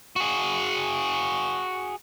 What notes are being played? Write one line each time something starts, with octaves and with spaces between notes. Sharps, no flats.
F#4 G#4